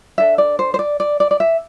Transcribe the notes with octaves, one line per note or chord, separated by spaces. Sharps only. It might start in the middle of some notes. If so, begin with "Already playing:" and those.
D4 A4 E5
D5
C5
C5
D5
D5
D5
D5
E5